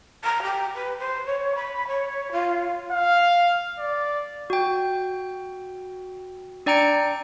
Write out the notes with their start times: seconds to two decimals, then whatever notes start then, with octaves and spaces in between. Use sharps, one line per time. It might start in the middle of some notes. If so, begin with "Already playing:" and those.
0.24 A#5
0.43 G4
0.75 B4
0.99 C5
1.25 C#5
1.55 B5
1.88 C#5
2.32 F4
2.92 F5
3.79 D5
4.50 F#4 G5
6.66 D4 D5 G5 A#5 C#7 D7